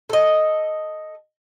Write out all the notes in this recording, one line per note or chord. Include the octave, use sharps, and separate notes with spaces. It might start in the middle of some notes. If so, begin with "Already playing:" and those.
A4 D#5